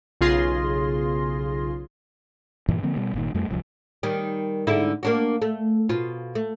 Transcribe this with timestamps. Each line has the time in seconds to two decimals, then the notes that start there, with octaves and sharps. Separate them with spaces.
0.21 B1 C#3 F4 G#4 C6 A#6
2.68 G2 A#2 E3
2.83 D3 F3 A#3 C4
2.96 B2 G3
3.13 G1 A#2 D#3
3.34 F2 G3 A3
3.49 D1 C2 F3
4.03 D#3 G3
4.67 G#2 D3 E4
5.03 A#3 D4 F#4
5.42 A3
5.89 B2 F4
6.35 A3